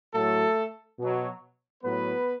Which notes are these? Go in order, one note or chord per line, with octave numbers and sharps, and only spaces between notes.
A2 F#3 A3 A4
B2 F#3
A2 F#3 B3 B4